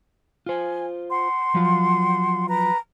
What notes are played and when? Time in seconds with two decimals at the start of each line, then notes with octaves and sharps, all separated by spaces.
0.46 F4 C5 G#5
1.08 F#5 C6
1.55 F3 F#3 F4
2.47 B4 A#5